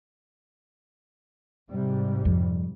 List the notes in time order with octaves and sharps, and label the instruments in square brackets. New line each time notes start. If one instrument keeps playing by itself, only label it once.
[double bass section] G#2 C3 G3
[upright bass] F2